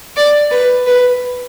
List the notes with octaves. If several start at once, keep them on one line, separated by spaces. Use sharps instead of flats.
D5
B4
B4